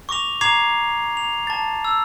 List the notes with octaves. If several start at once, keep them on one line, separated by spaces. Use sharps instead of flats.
C#6 D6 A#6 F7
A#5 D6 G#6 C7 F7
F7
A5 A6
E6